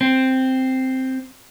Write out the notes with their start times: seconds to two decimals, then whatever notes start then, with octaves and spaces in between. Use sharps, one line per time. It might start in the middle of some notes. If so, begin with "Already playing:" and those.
0.01 C4